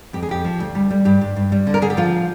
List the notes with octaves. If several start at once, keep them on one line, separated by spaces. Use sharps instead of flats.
F2 G4
G#4
F2 G4
F3
D2
G3
G3
G2 G4
G2
G2
G3
D3
A#4
D3 G#4
G4
F3 F4